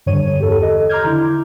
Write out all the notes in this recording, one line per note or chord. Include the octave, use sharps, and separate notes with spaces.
G2 D3 C#5 D#7
E2 G4 A4
A4 D#5
A#5 C6 D6 F6 G6 G#6
D3 E4